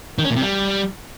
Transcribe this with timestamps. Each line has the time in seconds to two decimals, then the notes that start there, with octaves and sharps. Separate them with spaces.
0.19 D#3
0.24 C#4
0.30 A#2
0.36 C3
0.42 G3